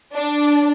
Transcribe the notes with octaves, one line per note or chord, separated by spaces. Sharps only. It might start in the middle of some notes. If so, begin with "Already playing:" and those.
D4